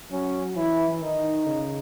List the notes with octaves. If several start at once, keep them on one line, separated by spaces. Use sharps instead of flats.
F#3 C#4
E3 E4
D#3 D#4
C#3